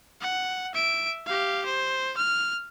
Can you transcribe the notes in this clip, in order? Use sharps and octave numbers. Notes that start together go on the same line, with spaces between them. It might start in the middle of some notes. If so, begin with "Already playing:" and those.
F#5
E5 D7
G4 F5
C5
F6